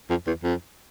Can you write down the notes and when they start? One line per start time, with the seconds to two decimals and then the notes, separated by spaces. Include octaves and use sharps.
0.10 F2
0.27 E2
0.44 F2